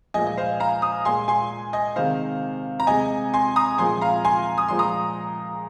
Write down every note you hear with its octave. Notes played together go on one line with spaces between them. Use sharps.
A#2 F3 G#3 D#5 G#5
D#5
C5 F5
F5 A#5
A#5 D#6
A#2 G#3 G#5 C6
G#5 C6
D#5 G#5
C3 D#3 G#3 C5 F5
A#5
C3 G#3 D#5 G#5
G#5 C6
A#5 D#6
A#2 F3 G#3 G#5 C6
F5 A#5
G#5 C6
D#6
A#2 F3 G#3 C6
A#5 D#6